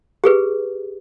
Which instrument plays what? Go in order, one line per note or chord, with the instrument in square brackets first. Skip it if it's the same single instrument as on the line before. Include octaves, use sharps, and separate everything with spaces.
[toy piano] G4 G#4 B4